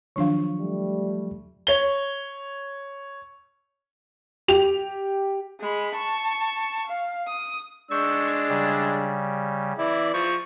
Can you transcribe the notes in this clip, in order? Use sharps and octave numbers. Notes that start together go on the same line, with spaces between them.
D#3 F3 F#3 D4 F5 C#6
G3 A3
C#5 G7
G4 F7
G#3 B5
A5 C#6
F5
D#6
G#3 D4 C#6 E6 G6
C#3 G3
E3 E4 D5
F3 C#6